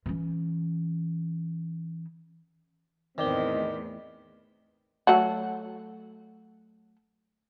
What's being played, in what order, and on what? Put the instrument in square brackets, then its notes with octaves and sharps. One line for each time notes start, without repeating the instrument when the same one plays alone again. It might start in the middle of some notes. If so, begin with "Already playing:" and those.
[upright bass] E3 C#4
[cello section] E2 A2 [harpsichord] D#3 [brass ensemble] C4 D#5 [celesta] D5 D6 G7
[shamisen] F#3 A3 F#4